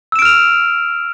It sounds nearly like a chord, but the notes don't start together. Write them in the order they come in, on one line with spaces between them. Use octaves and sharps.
E6 E7 D7 F6 F7